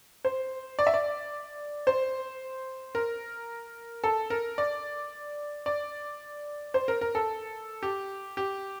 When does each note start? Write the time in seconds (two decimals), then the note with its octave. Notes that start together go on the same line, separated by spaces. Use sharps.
0.25 C5
0.79 D5
0.87 E5
0.94 D5
1.87 C5
2.95 A#4
4.04 A4
4.30 A#4
4.58 D5
5.66 D5
6.74 C5
6.88 A#4
7.01 A#4
7.15 A4
7.83 G4
8.37 G4